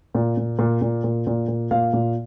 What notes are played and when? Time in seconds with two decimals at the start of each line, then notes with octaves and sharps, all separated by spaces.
0.15 A#2
0.37 A#2
0.59 A#2
0.82 A#2
1.04 A#2
1.27 A#2
1.48 A#2
1.71 A#2 F5
1.93 A#2